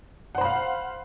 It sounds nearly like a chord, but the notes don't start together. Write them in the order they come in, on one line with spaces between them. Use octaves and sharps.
F#5 C5 B5 F5